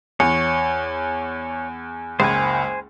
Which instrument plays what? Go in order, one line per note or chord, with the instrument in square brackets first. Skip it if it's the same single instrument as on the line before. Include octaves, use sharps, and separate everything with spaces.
[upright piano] E2 [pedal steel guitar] C#5
[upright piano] F#1 C#2 [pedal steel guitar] C5 G#5